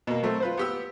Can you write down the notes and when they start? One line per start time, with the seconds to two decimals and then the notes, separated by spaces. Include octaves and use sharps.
0.07 B2 A#3
0.23 F#3 A3 C4
0.40 F4 B4 C5
0.57 B3 G4 E6